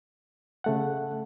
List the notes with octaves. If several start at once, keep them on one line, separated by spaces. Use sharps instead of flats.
C#3 A3 F#5